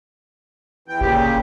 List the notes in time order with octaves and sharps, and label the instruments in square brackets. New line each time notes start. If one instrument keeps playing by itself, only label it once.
[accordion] E2 E3 G5
[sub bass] G1 [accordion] A#2 C#3 G4